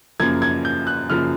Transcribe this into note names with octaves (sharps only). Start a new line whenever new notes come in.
F#2 C#3 F3 A#3 G#6
G#6
G6
F#6
F#2 C#3 F3 A#3 F6